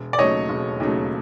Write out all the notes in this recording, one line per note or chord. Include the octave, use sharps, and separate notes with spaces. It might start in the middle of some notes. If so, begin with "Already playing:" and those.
Already playing: E1
D5
D#2 C#3 F#3 A3 C#5 D#5
E1
D#2 C#3 F#3 A3